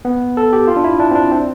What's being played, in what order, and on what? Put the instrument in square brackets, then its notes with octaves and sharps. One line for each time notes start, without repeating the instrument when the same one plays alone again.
[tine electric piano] B3
A4
G4
F4
D4
E4
D4
C4
D4
C4